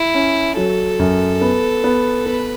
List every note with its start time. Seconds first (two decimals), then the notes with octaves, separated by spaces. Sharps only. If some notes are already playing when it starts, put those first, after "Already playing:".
Already playing: E4
0.14 C#4
0.57 F#3 A4
0.99 F#2
1.41 B3
1.84 B3
2.26 B3 B4